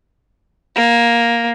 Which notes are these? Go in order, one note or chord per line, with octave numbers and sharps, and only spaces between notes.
A#3